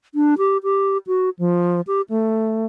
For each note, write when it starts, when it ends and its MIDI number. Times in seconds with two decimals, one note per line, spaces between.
0.15 0.35 62
0.38 0.58 67
0.63 0.98 67
1.07 1.30 66
1.39 1.81 53
1.87 2.01 67
2.10 2.67 57